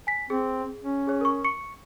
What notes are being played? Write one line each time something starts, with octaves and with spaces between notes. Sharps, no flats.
G#5 B6
C4 G#4
C#4
G#4 C#5
A#4 C#6
C#6 C#7